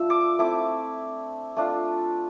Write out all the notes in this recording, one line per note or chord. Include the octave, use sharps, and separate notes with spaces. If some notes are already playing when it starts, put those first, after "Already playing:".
Already playing: F3 A3 D4 F4 E6
D6
A3 C4 E4 D6
A3 D4 F4